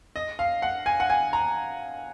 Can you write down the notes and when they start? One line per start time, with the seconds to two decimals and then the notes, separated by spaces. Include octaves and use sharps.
0.16 D#5
0.39 F5
0.62 F#5
0.86 G#5
1.00 F#5
1.10 G#5
1.33 A#5